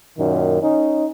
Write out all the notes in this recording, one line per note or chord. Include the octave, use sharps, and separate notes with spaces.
F#2 A#2 D#3
C#4 D#4